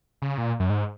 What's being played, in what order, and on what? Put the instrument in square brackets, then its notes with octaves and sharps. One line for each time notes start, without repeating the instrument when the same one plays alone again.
[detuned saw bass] C#3
A#2
F#2
G#2